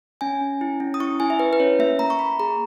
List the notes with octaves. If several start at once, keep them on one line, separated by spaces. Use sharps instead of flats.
C#4 G#5
C#4
E4
C#4
D#6
E4 C#6
E4 G#5
E5
E4 B4
B4
C#4 C#5
A#3 E5
A#3 A#5
C#6
A#3 B5
G#4 A#5